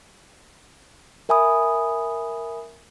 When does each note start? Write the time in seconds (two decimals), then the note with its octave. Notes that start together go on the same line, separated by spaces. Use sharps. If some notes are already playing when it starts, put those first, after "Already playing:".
1.29 A#4 E5 G#5 B5 D#6